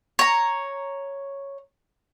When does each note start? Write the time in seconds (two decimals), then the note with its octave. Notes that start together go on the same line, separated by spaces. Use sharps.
0.19 C#5 A#5